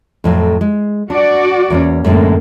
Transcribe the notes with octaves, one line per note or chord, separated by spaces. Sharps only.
F2 A2 F#3
G#3
D4 F#4 D5
E2 A#3 C#4
F#2 A2 D3 G#3 A#3